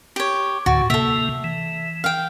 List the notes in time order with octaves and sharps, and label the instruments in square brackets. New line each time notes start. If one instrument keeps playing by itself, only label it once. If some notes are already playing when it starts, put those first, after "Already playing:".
[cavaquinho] G4 C#5
[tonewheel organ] D2 A2 D3 [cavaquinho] F#4
[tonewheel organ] C3 A#3 [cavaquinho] A4 E5
[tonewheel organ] E3
[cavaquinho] F5 G5